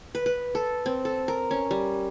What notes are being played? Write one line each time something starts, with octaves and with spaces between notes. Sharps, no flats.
B4
B4
A4
C4
A4
A#4
C#4
G3